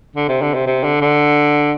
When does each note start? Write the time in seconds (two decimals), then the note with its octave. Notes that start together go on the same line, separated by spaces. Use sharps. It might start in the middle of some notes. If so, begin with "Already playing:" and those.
0.16 D3
0.29 C3
0.42 D3
0.54 C3
0.67 C3
0.84 D3
1.01 D3